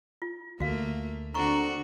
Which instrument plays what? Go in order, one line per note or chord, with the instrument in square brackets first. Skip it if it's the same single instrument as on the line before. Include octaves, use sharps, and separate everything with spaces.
[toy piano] F4
[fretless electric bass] D2 [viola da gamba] A3 A#3 [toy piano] F#4 F5
[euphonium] D3 [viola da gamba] C4 D4 F#4 [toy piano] A#5 C#6